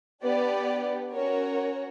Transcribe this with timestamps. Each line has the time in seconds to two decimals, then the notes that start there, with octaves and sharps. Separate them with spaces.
0.22 B3 D4 G4 B4 D5
1.13 C#4 F#4 A#4 C#5